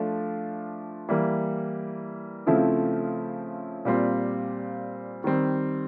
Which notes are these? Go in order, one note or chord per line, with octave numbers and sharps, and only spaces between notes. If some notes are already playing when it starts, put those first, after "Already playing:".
Already playing: F3 A3 D4 F4
E3 G3 A#3
C#3 F3 A3 C4 E4
A#2 G3 C4 F4
D#3 G3 C4